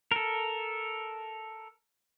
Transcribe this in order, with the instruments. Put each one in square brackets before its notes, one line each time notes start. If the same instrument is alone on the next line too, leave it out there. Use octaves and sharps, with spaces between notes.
[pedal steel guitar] A4 A#4